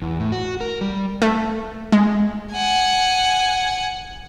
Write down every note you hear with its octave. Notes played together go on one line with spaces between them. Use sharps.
E2
A2
F#4
A#4
G3
A3
G#3
F#5 G#5